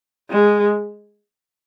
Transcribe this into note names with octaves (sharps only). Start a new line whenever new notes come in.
G#3